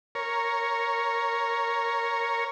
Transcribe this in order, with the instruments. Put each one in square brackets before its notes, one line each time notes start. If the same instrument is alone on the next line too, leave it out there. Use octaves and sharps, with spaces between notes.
[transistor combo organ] A#4 C#5